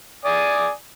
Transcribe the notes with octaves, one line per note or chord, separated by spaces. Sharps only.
D5 G#5 D#6